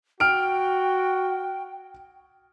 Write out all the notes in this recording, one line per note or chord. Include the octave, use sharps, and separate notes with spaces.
F#4 G5 F6 D7